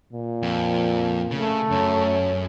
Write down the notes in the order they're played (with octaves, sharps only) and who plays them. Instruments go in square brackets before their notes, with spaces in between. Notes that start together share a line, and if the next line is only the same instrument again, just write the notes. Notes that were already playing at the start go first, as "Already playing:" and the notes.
[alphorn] A#2
[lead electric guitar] F2
[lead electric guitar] C#3 [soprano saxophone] A3
[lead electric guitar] F#2 [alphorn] C#4